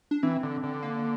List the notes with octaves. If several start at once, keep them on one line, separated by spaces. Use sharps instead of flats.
D4
E3 C4
D3
D3
A#3